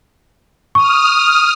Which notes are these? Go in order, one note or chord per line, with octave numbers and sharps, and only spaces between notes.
C#6 D#6 F6